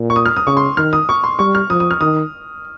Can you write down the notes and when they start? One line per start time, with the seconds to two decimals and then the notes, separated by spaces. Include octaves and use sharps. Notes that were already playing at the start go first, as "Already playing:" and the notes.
Already playing: A#2
0.10 C#6
0.16 D#6
0.26 F6
0.36 D#6
0.47 C#3 C#6
0.57 C6
0.77 D#3 F6
0.93 D#6
1.09 C#6
1.24 C6
1.39 G3 C#6
1.55 F6
1.70 F3 D#6
1.80 D#6
1.91 F6
2.01 D#3 D#6